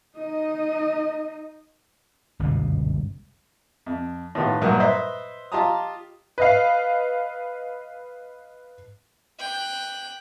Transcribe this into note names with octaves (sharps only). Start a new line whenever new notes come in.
D#4 D#5
G1 C#2 F#2 B2
F2
A2 D#3 B3 F4 G4
G2 A#2 F#3 A#4 D#6
B4 C5 D#5 E5
F4 G4 D#5 A5 A#5 D#6
B4 D#5 F5
G5 F#6